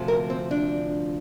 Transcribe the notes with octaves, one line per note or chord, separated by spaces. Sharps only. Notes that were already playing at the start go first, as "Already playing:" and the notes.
Already playing: D2 C3 F3
A#4
C4
D4